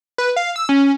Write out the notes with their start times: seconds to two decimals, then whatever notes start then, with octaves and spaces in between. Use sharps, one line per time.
0.18 B4
0.36 F5
0.56 E6
0.69 C#4